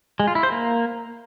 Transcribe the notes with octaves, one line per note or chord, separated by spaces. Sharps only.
G#3
F4
E4
C5
A#3